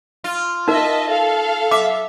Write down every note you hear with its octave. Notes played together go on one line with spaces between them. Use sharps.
F4
D#4 A#4 D#5 E5 A5
A4 F5
E5 D6